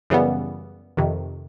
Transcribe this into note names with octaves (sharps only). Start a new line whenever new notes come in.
F#2 C#3 E3 G3 B3
F2 C3 D#3